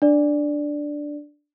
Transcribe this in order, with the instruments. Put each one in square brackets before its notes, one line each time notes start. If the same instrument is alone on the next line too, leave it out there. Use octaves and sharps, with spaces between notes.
[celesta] D4 D5